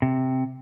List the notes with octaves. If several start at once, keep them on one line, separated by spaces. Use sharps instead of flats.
C3